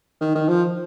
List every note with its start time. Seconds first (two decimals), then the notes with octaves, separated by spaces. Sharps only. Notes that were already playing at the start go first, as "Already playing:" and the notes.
0.21 D#3
0.35 D#3
0.48 F3